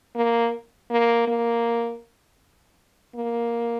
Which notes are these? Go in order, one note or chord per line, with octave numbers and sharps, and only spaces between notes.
A#3
A#3
A#3
A#3